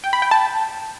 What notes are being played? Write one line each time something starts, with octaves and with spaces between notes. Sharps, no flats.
G5
B5
G5
A5